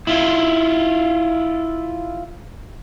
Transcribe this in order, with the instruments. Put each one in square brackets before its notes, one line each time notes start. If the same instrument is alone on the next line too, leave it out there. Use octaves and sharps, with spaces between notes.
[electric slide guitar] E4 F4